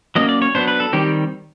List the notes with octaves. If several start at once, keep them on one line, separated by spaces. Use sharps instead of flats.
F#3 A#3 C#4 D#5
D5
C#5
F#3 B3 D4 C5
B4
A4
D#3 G3 C4 G4